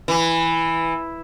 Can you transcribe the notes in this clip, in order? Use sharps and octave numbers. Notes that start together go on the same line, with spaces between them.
E3